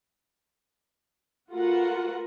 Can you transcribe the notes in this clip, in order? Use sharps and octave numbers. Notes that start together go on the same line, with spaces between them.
A3 F4 F#4 A#4 B4 F#5